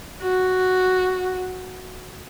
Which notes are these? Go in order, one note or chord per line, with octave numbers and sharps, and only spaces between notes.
F#4